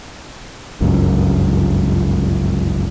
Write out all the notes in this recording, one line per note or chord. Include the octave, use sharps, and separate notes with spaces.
G1 C#2 F#2